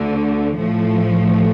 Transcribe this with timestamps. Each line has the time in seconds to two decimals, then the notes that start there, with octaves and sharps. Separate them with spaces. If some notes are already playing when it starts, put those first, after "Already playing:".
Already playing: D2 D3 A3
0.58 A2 F3 A3